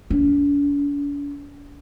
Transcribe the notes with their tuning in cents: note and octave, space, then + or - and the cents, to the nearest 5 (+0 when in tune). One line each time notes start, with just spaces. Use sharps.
D4 -45